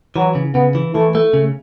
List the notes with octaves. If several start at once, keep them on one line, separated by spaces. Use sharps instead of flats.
E3 F#3
C#3
C#3 B3
E3
E3 A3
A3
C#3